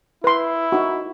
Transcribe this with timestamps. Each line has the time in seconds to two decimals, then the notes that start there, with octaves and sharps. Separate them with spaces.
0.24 E4 B4 C6
0.72 D#4 F#4